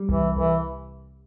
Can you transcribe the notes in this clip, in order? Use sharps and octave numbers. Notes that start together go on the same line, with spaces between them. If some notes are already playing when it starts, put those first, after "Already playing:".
Already playing: G3
C2 E3
C2 E3